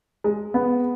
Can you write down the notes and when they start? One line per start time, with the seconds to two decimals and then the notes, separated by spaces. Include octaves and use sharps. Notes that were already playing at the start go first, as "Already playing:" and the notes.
0.24 G#3
0.54 B3